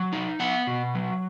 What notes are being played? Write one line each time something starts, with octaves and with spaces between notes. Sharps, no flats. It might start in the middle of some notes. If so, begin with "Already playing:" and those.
Already playing: F#3 F#5
D#4
B3 F#5
B2
F#3